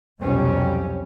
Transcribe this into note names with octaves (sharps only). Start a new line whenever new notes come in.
C2 F2 B2 F#3 G3 C#4